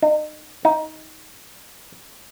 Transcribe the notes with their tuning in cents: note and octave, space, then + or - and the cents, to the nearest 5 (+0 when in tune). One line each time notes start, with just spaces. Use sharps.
D#4 -35
D#4 +15